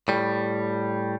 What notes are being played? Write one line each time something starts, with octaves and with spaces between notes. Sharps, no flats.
A2 G3